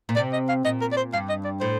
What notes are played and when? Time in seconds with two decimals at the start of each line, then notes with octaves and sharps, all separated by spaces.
0.09 A#2
0.16 C3 D5
0.33 D#5
0.49 F5
0.64 A#2 D#5
0.81 A#4
0.92 D5
0.97 C5
1.13 G2 F5
1.29 D#5
1.45 D5
1.60 A2 C5